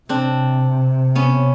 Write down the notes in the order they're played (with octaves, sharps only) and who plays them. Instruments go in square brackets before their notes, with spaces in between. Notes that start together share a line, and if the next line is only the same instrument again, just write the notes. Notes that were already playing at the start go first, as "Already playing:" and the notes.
[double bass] C3 [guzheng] C4 D4
[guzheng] B3 C#4